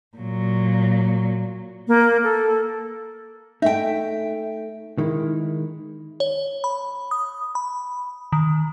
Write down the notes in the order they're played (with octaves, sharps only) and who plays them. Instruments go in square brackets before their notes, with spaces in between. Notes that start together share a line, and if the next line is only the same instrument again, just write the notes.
[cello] A#2 F#3
[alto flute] A#3
A4
[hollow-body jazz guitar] A3 D#4 [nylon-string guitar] E5 G5
[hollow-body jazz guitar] D#3 G#3 E4
[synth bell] C#5
B5
D#6
B5
D#3